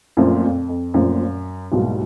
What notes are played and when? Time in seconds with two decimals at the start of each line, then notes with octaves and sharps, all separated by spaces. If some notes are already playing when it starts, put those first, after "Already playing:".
0.17 F#2 A#2 F3 A3 C4
0.44 F2
0.69 F2
0.94 F#2 A#2 F3 A3 C4
1.72 C2 G#2 B2 F#3 A#3